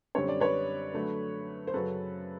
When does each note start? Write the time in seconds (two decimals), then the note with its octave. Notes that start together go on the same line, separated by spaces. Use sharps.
0.15 F#2 D3 G3 C4 C#5
0.28 D5
0.40 B4 C#5
0.94 D3 F#3 A3
1.67 C5
1.73 F#2 C#3 F#3 A4 B4